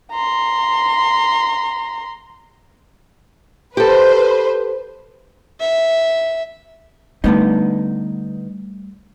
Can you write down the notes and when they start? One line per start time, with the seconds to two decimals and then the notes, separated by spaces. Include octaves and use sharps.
0.12 A#5 C6
3.77 G4 A4 B4 C5
5.60 E5
7.24 D3 G3 A3 B3 D#4